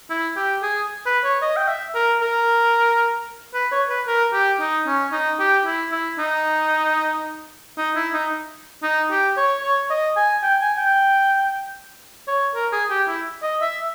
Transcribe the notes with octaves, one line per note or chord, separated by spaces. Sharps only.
E4
G4
G#4
B4
C#5
D#5
G5
E5
A#4
A#4
B4
C#5
B4
A#4
G4
D#4
C#4
D#4
G4
E4
E4
D#4
D#4
E4
D#4
D#4
G4
C#5
C#5
D#5
G#5
G5
G#5
G5
C#5
A#4
G#4
G4
E4
D#5
E5